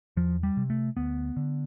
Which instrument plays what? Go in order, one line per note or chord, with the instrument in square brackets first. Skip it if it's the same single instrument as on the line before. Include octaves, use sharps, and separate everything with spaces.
[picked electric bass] E2 F3
G3
C3
A3
D2 B3
D3